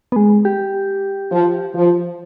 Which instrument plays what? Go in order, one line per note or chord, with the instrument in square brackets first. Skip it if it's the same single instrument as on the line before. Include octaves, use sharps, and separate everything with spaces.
[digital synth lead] B3
G#3
G4
[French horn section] F3
F3